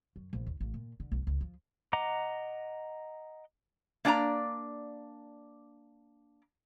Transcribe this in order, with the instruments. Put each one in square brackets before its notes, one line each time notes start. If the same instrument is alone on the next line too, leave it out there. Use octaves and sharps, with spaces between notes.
[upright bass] F#2
A#1
D#2
A1
A#2
D3
B1
C#2
F3
[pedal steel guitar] D#5 F#5 A#5 D6
[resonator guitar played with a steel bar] A#3 D4 D5 G#5 A#5